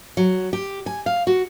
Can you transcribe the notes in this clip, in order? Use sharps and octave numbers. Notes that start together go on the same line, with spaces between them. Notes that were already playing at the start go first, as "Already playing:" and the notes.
F#3
G4
G#5
F5
F#4